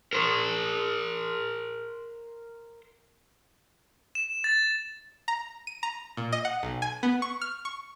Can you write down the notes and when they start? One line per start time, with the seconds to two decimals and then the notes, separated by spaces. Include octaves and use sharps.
0.13 A#4 C5
4.15 E7
4.44 A6
5.28 A#5
5.67 D#7
5.83 A#5
6.17 A#2
6.32 D#5
6.45 F#5
6.63 B1
6.82 G#5
7.03 B3
7.22 C#6
7.41 F6
7.65 C#6